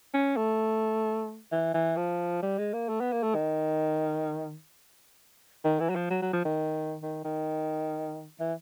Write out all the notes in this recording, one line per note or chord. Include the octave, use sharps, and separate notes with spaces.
C#4
A3
E3
E3
F3
G3
G#3
A#3
A3
B3
A#3
A3
D#3
D#3
E3
F#3
F3
F#3
F#3
F3
D#3
D#3
D#3
E3